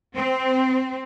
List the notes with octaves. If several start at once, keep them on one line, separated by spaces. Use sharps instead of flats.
C4